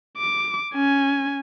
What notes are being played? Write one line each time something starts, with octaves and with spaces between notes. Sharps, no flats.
D6
C#4 G#5